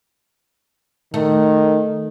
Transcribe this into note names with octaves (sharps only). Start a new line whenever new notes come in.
D#3 A3